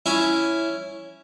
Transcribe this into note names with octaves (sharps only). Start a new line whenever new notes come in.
C#4 E4